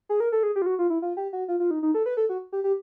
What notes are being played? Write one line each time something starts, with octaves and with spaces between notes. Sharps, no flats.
G#4
A#4
A4
G#4
G4
F4
F#4
F4
E4
F4
G4
F#4
F4
F4
D#4
D#4
A4
B4
A4
F#4
G4
G4